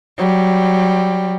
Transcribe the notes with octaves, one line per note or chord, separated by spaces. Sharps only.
F#3 G3